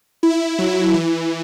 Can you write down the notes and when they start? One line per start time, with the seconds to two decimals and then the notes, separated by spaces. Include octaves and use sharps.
0.23 E4
0.59 F#3
0.94 E3